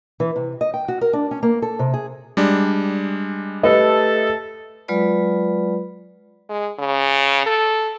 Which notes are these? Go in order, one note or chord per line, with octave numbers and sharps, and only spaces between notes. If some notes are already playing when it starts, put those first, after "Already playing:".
E3
C3
D#5
G5
F#4
A#4
D4
C#4
A#3
A4
C3
G#4
G3 G#3 D4
A3 G4 A4 B4 D#5
F#3 G#3 F4 B4 D5 B5
G#3
C#3
A4